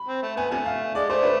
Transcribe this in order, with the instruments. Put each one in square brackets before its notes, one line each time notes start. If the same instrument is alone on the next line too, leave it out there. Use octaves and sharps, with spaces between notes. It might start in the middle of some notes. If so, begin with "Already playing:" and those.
Already playing: [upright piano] B5
[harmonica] C4
A3
[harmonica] B3 [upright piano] G#5
[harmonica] C3 F3 A3 [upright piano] G#5
[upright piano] F5
[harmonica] G#3 [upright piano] D5
[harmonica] A3 [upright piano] C5
[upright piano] B4